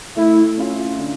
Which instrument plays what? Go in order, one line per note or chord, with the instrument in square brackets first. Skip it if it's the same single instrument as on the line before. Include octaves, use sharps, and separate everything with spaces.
[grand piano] A3 [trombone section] E4
[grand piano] C#4 F4
D3